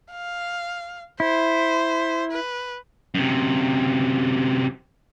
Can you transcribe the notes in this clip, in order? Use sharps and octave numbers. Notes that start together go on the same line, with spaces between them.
F5
E4 C5
B4
F#2 C3